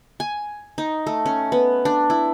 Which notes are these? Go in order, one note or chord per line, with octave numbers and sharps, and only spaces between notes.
G#5
D#4
A3
C#4
B3
D4
E4